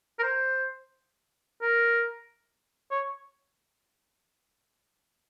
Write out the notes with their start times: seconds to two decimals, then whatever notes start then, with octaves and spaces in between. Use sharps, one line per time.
0.19 A#4
0.23 C5
1.62 A#4
2.91 C#5